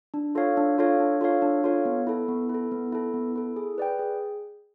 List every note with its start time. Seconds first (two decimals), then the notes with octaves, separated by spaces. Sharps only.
0.14 D4
0.35 F4 A4 C#5 F5
0.57 D4
0.78 F4 A4 C#5 F5
1.00 D4
1.21 F4 A4 C#5 F5
1.42 D4
1.64 F4 A4 C#5 F5
1.85 B3
2.07 E4 A4
2.28 B3
2.49 E4
2.54 A4
2.72 B3
2.92 E4 A4
3.14 B3
3.36 E4 A4
3.56 G#4
3.78 B4 D5 G5
3.99 G#4